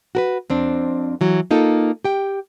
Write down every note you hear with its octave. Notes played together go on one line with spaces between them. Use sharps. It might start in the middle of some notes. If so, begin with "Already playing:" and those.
F#4 A#4 B4
F2 C4 D4
E3 F#3
A#3 D#4 F4 A4
G4 G5